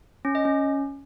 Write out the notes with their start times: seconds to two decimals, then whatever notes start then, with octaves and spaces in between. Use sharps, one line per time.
0.25 C#4
0.35 D#5
0.45 C#4